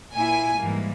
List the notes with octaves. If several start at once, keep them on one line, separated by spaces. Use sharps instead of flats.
A#2 A#3 E4 G#5
G#2 E3 G3 A#3